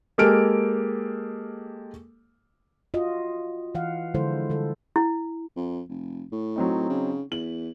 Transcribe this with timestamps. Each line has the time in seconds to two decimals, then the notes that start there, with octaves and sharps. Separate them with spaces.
0.18 G#3 A#3 G4 A4 F6 D7
2.94 F4 F#4 D#5
3.75 E3 F5 F#5
4.14 D3 F3 G#3 E4 A4 C5
4.50 D3 G3 A4
4.96 E4
5.57 F2
5.89 F1
6.32 A2
6.56 F#3 C4 D#4
6.90 C#3
7.32 E2 F#7